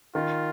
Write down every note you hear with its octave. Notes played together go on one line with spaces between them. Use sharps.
D#3 F4